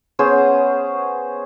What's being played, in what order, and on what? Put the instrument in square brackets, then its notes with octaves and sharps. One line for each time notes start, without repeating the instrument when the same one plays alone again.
[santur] B3 C#4 G#4 C5